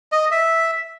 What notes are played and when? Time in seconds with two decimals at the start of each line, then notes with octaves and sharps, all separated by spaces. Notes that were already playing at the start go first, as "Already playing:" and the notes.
0.12 D#5
0.31 E5